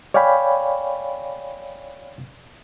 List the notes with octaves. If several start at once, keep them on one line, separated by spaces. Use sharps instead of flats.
C#5 D5 F5 G5 G#5 B5